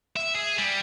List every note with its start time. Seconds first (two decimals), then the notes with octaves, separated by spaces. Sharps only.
0.16 E5
0.35 G#4
0.58 G3